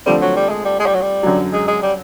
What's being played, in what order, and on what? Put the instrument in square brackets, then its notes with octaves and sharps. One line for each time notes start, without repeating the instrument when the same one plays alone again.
[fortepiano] D3 F3 A3 C4 [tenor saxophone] G3
[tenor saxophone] F#3
G3
G#3
G3
G#3
G3
F#3
G3
[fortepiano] F#2 D3 F#3
[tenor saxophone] G#3
G#3
G3